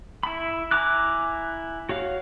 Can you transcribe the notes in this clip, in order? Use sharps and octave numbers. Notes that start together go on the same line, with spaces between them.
E4 B5
E4 G#5 A#5 D6 F#6
F#4 C#5 F5